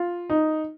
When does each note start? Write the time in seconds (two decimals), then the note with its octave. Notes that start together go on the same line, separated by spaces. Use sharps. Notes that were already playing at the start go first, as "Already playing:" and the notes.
Already playing: F4
0.30 D#4